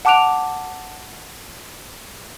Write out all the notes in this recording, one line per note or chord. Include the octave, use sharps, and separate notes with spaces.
F#5 A5 D6 F#6 D7 F7